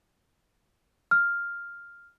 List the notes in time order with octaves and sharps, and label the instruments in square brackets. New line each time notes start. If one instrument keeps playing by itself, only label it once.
[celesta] F6